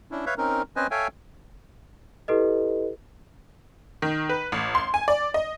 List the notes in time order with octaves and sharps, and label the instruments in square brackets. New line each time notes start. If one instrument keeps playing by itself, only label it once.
[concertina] C#4 D4 E4
B4 C#5 E5 F5
C4 C#4 D#4 A#4
C4 C#4 B4 C5 D#5 G#5
A4 C#5 E5 F5 G5 G#5
[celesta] E4 G4 A4 B4 D#5
[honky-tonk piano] D#3
B4
A1
C6
G#5
D5
D#5